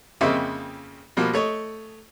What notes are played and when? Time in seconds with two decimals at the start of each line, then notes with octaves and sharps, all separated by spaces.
0.21 F2 C#3 A#3 C4 D#5 E5
1.17 B2 F3 G3 A#3
1.33 A3 C#5 D#5